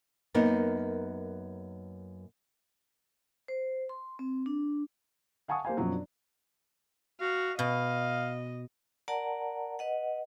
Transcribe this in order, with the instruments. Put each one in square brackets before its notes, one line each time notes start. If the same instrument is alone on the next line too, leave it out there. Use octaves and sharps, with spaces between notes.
[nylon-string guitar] F#2 A#3 B3 D#4
[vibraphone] C5
C6
C4
D4
[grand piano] F5 F#5 G#5 A5 C#6 D#6
A#3 G4 C5 F5 G#5
F#2 B2 F3 F#3
D4
[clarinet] F#4 [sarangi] F5
[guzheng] B2 [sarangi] D#5 [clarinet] F5
[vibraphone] A#4 D5 F#5 A5 A#5
B4 D#5 F#5